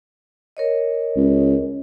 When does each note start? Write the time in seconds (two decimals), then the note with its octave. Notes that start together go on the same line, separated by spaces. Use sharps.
0.57 A#4 C#5 D#5
1.16 C#2